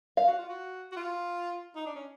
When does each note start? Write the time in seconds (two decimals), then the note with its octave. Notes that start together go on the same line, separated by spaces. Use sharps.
0.17 F5
0.28 F#4
0.39 F4
0.49 F#4
0.92 F#4
0.96 F4
1.76 D#4
1.86 D4
1.95 C#4